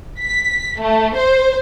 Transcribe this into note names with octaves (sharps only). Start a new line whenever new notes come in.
B6
A3
C5